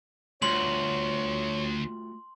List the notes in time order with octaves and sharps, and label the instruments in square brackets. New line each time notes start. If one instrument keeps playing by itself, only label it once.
[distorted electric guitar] D2 [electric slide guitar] A3 F4 F#4 [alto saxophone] C#5 [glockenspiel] C6 F#7